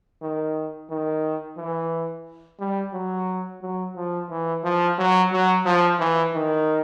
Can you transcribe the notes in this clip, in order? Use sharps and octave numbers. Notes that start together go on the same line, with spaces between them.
D#3
D#3
E3
G3
F#3
F#3
F3
E3
F3
F#3
F#3
F3
E3
D#3